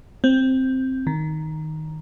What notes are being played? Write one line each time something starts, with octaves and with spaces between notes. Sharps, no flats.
C4
D#3